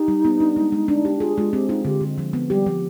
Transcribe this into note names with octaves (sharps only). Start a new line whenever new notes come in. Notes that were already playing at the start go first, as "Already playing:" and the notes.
Already playing: D#4 G4
G3
B3
D4
G#3
G#3
D4
G4
D#4
F4 G#4
G#3 F4
C4 G4
D#4 F4
D3 G4
D3
G#3
F3
B3
G3 G4
F3